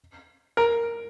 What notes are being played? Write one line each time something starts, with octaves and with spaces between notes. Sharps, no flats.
A#4